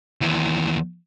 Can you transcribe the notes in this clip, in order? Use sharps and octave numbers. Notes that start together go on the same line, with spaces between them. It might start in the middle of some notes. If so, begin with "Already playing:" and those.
D#2 E3